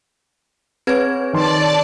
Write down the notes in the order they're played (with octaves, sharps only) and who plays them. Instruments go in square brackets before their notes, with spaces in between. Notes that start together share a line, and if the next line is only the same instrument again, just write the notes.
[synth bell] C4 B4 G#6 [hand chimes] G#4 C#5
[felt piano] D#3 C6 [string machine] D5 A5